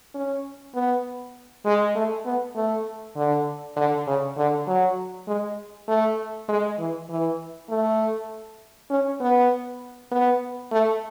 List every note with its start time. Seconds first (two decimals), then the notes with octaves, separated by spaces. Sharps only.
0.14 C#4
0.75 B3
1.66 G#3
1.96 A3
2.26 B3
2.56 A3
3.16 D3
3.77 D3
4.07 C#3
4.37 D3
4.67 F#3
5.28 G#3
5.88 A3
6.49 G#3
6.79 E3
7.09 E3
7.70 A3
8.90 C#4
9.21 B3
10.11 B3
10.72 A3